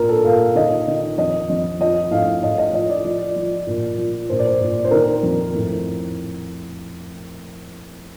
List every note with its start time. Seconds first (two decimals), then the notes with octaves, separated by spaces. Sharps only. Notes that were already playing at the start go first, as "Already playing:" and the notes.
Already playing: A#2 A#4
0.09 A4
0.24 A#2 F5
0.40 F5
0.55 D#3 D#5
0.87 D#3
1.18 F2 D#5
1.50 F2
1.80 F3 D#5
2.11 A2 F5
2.42 A2 D#5
2.58 D#5
2.73 F3 D#5
2.90 D5
3.04 F3
3.36 F3
3.67 A#2
3.98 F3
4.30 A#2 C5
4.39 D5
4.47 C5
4.61 A#2
4.84 C5
4.91 D#3 A#4
5.23 F2
5.54 A2